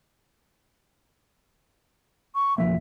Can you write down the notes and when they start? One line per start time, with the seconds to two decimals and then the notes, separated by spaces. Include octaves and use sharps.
2.35 C#6
2.58 E1 F3 A#3 E5